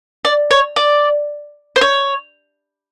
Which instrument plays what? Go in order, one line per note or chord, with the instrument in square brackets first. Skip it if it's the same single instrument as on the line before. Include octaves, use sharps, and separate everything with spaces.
[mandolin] D5
C#5
D5
C5
C#5